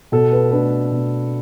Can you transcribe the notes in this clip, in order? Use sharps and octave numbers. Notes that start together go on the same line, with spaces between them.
B2 A4
B4
A3 D4 B4
B2